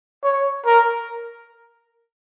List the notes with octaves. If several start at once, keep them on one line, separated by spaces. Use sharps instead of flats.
C#5
A#4